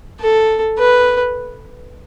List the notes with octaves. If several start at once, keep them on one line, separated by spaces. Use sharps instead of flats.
A4
B4